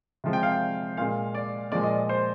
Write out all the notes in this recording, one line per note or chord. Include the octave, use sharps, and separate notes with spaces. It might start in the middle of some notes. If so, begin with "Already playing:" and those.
C3 F3 G#3
G5
F5
G5
A#2 G#3 F5
D5
A#2 F3 G#3 D5
D#5
D5
C5